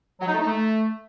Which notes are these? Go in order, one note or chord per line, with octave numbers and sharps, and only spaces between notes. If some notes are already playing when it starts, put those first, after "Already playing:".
F#3
D#4
A3
D#4
A3